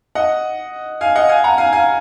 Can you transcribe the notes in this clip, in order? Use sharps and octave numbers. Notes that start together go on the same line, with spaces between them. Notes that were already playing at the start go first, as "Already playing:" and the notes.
D#5 F#5
F5 G#5
D#5 F#5
F5 G#5
F#5 A#5
F5 G#5
F5 G#5